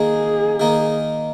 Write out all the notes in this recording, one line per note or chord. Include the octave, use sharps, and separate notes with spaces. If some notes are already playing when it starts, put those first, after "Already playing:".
Already playing: D#3 A#3 D#4 G#4
D#3 A#3 D#4